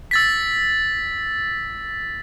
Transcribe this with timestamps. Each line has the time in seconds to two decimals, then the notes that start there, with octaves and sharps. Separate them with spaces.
0.11 E6 A6 B6